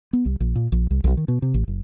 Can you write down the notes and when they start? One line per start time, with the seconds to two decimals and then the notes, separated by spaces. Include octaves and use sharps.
0.13 B3
0.26 C2
0.40 A#1
0.56 A#2
0.72 A#1
0.91 C2
1.04 B1
1.17 D#3
1.28 B2
1.42 C3
1.54 A1
1.68 F#1